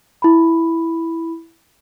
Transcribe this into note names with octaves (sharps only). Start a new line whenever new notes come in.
E4 B5